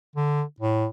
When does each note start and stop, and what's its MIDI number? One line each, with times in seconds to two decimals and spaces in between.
0.16 0.42 50
0.60 0.86 45